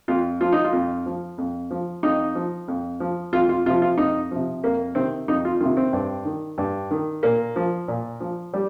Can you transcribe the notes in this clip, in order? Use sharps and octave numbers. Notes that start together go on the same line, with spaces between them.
F2 F4
F3 F4
D#4
F4
F2
F3
F2
F3
F2 D#4
F3
F2
F3
F2 F4
F4
C3 F3 F4
F4
F2 D#4
C3 F3
F2 A#3
C3 D#3 C4
F2 D#4
F4
C3 D#3 F4
C4
G2
D#3
G2
D#3
A#2 A#3
F3
A#2
F3
G3